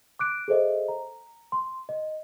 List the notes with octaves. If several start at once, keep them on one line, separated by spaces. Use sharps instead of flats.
D6 F#6 D7
G#4 A4 C5 D#5 E5
A#5
C6
D#5